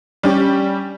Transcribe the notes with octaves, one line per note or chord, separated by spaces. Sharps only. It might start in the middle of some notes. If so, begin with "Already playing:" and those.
G3 C#4 G4